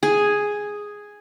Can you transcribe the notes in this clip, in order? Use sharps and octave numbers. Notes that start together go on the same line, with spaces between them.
G#4